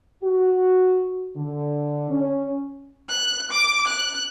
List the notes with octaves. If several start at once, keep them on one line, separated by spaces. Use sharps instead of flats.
F#4
D3
C#4
F#6
D6
F#6